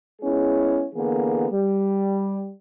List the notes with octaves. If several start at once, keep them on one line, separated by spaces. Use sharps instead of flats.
G#3 B3 C#4 E4 G#4
D3 E3 A#3 B3 G#4
G3